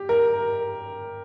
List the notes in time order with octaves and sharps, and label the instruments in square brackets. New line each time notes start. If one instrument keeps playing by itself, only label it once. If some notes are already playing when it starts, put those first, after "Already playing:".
Already playing: [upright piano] G4
A#4